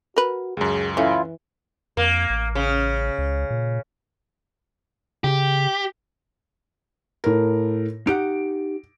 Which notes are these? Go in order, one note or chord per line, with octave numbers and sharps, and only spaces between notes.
F#4 A#4 B4
C#2 F#2 G#4
E3 A3 C#4 E4 F4
F2 A#3
A1
C#3
C#2
A#2
C#3 G4
A2 A#4
D#4 G4 F#5 D7